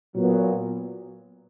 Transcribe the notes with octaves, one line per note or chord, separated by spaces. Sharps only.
A#2 F#3 B3